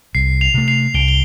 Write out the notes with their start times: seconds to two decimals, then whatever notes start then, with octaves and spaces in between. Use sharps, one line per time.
0.15 C2 C7
0.41 C7 F7
0.54 C3 A3
0.68 C7 F7
0.94 C2 D7 G7
1.08 G7